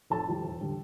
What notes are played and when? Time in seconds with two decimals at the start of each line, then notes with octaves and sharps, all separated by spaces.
0.10 F1 A4 A5
0.27 F2 E3 G3
0.44 E1
0.61 D3 G3